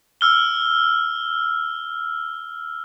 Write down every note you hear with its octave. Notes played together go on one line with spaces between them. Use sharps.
E6 F6 G7